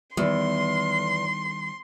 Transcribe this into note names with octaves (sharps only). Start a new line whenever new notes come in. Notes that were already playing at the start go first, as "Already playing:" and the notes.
E2 D#3 G3 C6